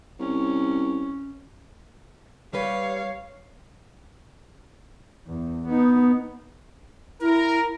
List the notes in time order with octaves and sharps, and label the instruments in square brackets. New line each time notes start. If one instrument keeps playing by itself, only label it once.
[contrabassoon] C2 [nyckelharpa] C#4
[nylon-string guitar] G3 G4 B4 [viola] C#5 F5
[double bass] E2
B3 D#4
[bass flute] E4 [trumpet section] A#4